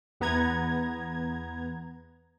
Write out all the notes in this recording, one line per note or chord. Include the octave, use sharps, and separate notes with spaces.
E2 B3 A#5 G#6